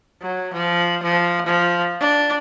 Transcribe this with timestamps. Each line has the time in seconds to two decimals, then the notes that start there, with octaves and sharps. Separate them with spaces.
0.22 F#3
0.53 F3
1.03 F3
1.46 F3
2.01 D4